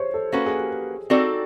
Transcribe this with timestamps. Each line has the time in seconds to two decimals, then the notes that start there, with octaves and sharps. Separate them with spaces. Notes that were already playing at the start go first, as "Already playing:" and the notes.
Already playing: C5 C#5
0.14 A4
0.32 A#3 C#4 F#4 A4 B4
0.46 G#4
0.59 G4
1.10 C4 D#4 F#4 A4 D5